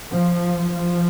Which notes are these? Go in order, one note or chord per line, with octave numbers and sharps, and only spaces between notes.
F3
F3